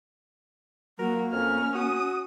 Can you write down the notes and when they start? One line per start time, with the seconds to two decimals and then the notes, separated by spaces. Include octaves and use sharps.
0.99 F#3 A#3 F#4 A#4
1.32 F2 C#4 F6
1.75 F#4 D#6